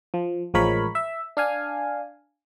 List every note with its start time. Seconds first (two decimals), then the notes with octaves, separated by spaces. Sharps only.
0.14 F3
0.54 A1 F3 G#3 A#4 C#5 B5
0.95 E5
1.37 D4 F5 G#5